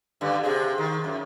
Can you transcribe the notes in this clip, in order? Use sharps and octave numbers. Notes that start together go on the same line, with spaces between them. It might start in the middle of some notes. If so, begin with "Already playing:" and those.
G2 D3
C3 G#4
D#3
F#2